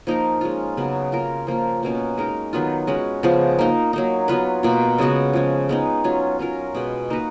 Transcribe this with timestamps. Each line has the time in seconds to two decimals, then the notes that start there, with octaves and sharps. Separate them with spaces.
0.07 F3 A#3 D#4 A#4
0.41 G#3 C#4 F4
0.77 C#3 F#3 B3
1.12 A#3 F4 A#4
1.47 F3 A#3 F4
1.83 B2 A#3 C#4
2.18 G#3 D#4 A#4
2.53 D#3 F#3 B3 F4
2.87 G#3 C#4 F#4 B4
3.23 C#3 F3 G#3 B3
3.59 A#3 D#4 A#4
3.93 F#3 A#3 D#4
4.28 F#3 B3 F4 B4
4.63 B2 A#3 F4
4.98 C#3 G#3 B3 F#4
5.33 F3 G#3 C#4
5.69 G#3 B3 D#4
6.04 F#3 C#4 F4
6.39 F#3 C#4 F4 A#4
6.75 B2 G#3 B3
7.10 A#3 D#4 F#4 B4